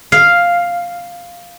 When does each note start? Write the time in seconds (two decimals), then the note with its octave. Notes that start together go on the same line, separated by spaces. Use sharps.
0.12 F5